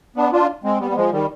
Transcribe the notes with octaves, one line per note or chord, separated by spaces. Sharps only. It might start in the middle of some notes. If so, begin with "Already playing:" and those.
B3 D4
D4 F4
G#3 C4
G3 B3
B3
F3 G#3
D#3 G3